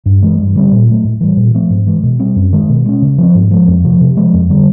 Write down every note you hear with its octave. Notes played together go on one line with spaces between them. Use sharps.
G2
E3 G#3
G2
D3 G3 C4
A#2
F#3 A3
A2
E3 G3
A#2
F3 A3 C4
G#2
E3 G#3
B2
G3 C4
F#2
D#3 G#3
B2
G#3 C#4
C#3
F3 A3 C4
G#2
F3 G#3
F2
C3 F3
C3
F3 G#3
F2
D3 G3